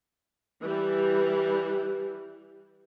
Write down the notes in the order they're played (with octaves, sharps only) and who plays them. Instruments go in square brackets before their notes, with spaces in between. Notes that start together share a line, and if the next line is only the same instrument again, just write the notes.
[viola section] E3 G3